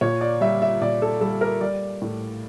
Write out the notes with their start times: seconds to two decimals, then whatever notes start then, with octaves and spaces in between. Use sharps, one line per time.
0.01 A#2 C#5
0.21 D5
0.41 G3 E5
0.62 E5
0.81 A#2 D5
1.02 A4
1.21 G3 A4
1.41 A#4
1.61 G3 D5
2.02 A2